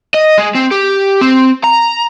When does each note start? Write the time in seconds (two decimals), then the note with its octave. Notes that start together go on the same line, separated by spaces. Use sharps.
0.14 D#5
0.38 G#3
0.55 C4
0.71 G4
1.21 C4
1.64 A#5